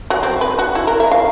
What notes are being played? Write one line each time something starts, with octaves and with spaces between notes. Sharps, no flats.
F#3
C4
B4
F#4
E4
A#4
E5
F5